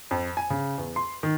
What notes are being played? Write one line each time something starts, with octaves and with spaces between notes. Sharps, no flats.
F2
G#5
C#3
E2
C6
D#3